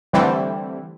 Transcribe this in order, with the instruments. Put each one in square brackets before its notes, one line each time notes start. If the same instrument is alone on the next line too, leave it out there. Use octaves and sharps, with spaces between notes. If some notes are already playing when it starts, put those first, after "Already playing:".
[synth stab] D3 E3 G3 A3 C4 E4